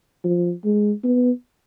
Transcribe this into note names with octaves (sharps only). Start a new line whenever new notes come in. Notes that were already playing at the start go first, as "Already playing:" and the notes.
F3
G#3
B3